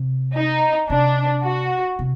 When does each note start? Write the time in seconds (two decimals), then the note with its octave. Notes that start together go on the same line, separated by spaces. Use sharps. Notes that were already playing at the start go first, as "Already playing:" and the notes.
Already playing: C3
0.35 D#4
0.90 C3 D4
1.44 F#4
1.99 C3